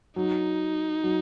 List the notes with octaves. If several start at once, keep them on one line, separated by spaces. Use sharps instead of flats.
F#3 D#4
F#3